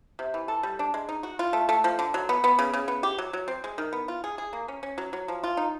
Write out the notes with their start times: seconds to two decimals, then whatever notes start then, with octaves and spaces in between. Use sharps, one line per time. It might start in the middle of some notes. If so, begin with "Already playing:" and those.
0.19 C3
0.34 E3
0.48 A4
0.63 G3
0.79 D4
0.94 G#3
1.09 D#4
1.23 F#4
1.39 F4
1.53 A3
1.69 A3
1.84 F3
1.99 D3
2.14 F#3
2.29 B3
2.44 B3
2.59 C#3
2.73 C#3
2.88 B3
3.03 G4
3.18 F#3
3.33 F#3
3.48 C4
3.64 G#3
3.78 D#3
3.93 B3
4.08 F4
4.24 G#4
4.38 G#4
4.53 A#3
4.68 C#4
4.83 C#4
4.98 F#3
5.13 F#3
5.28 F3
5.43 F4
5.57 D#4